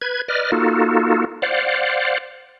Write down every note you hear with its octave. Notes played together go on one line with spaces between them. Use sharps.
B4 G#6
B4 D5 D#5 F6
A#3 D#4 F4 F#4 A4
C5 D5 F5 F#5